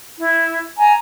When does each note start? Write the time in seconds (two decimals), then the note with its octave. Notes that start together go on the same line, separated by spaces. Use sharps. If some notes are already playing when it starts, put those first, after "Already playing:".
0.18 E4
0.77 G#5 A#5